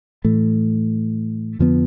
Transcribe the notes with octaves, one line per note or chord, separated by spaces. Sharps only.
A2 E3 A3
F2 D3 F3 B3